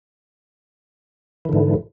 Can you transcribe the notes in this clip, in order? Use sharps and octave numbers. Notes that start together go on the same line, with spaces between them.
G#2 D3 E3